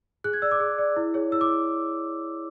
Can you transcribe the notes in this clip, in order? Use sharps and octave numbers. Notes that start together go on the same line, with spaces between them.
G#4 F#6
G#6
D5 E6
D6
G#4
D5
E4
G#4 C#5
E4 E6
D6